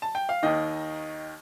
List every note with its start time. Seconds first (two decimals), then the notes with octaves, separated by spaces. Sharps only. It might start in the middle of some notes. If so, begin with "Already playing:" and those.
0.02 A5
0.15 G5
0.29 F5
0.43 D#2 D#3 D#5